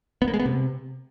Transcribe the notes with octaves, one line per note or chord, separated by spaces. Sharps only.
B3
A#3
G#3
B3
C3